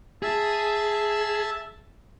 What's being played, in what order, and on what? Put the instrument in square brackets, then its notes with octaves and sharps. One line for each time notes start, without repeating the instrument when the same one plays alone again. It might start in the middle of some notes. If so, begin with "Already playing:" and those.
[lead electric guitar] G#4 [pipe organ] E5 A5 E6